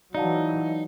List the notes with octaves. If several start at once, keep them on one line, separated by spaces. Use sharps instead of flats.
E3 F#3 D#4 D5 F5 A5